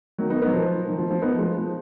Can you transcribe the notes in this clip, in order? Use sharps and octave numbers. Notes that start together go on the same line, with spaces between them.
D#3 F#3
B3 D#4
B3 D#4
F#3
F3
D#3
F3
F3
B3 D#4
F3 G#3
F3